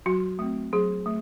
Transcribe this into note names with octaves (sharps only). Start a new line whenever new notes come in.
F#3 F#4
A3 C4
F#3 G#4
A3